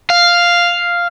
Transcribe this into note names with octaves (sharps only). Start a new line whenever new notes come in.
F5